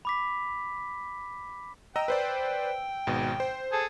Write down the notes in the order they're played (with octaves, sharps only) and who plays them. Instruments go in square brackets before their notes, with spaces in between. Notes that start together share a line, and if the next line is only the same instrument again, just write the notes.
[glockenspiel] B5 D6 B6
[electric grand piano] D#5 A#5 E6 [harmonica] G5
[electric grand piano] B4 C5 D5
G#1 G#2 B2
C5
[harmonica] G#4 A4